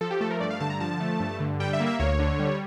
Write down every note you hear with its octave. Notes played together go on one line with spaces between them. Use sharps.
F3 A4
G4
A3 A4
A#4
G2 D5
F5
D3 A5
A#5
F3 A5
A3
G2
D3
G3 G5
E5
A#3
E5
D2 C#5
D3
G3